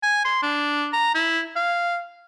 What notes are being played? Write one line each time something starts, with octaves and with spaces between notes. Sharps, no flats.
G#5
C6
D4
A#5
E4
F5